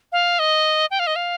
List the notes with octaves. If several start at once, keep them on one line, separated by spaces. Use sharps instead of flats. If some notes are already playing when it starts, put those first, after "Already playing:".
F5
D#5
G5
F5
D#5
F5